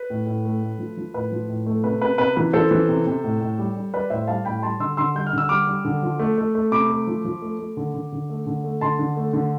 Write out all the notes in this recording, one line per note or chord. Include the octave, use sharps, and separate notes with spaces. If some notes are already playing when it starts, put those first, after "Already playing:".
Already playing: B4
A2
A2
A3
A3
F3
F3
A2 B4
F3
A2
A3
C3 B4
C3 B4
C3 B4
E3 B4
E3 A4 C5
E3
C3
C3
A2
A2
G3
G3
G3 B4 D5
A2 C5 E5
G3 F5 A5
A2 G5 B5
G3 A5 C6
D3 C6 E6
D3 C6 E6
G3 G6
F6
D3 E6
G3 D6 F6
G3
D3
F3
A3
A3
A3
C3 B5 D6
A3
F3
F3
A3
A3
D3
D3
D3
A3
D3
A3
D3 A5 C6
D3
A3
D3